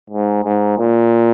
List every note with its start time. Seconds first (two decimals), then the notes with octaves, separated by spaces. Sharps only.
0.10 G#2
0.44 G#2
0.79 A#2